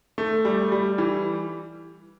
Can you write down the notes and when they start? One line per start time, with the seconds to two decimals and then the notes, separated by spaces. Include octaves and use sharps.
0.18 A3
0.45 G3
0.72 G3
0.98 E3